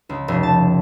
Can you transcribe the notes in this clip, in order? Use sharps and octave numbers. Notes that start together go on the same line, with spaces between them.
C#2
F1
A5